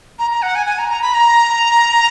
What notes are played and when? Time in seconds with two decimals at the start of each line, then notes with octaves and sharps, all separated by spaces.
0.19 A#5
0.31 A#5
0.42 F#5
0.55 G#5
0.66 G#5
0.79 A#5
0.90 A#5
1.02 B5
1.14 A#5